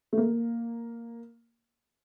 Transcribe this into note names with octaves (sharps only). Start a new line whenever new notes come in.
A3
A#3